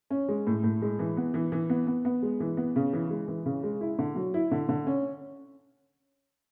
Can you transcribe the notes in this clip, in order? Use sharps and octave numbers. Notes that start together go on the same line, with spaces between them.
C#4
G#3
A2
A2
G#3
E3
B3
E3
E3
B3
B3
B3
G#3
E3
B3
C#3
E3
G#3
E3
C#3
G#3
E4
D3
F#3
E4
D3
D3
C#4